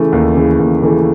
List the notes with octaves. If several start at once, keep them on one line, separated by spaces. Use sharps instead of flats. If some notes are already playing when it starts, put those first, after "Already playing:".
Already playing: C#3 E3 A3
D#2
C#3 E3 A3
D#2
C#3 E3 A3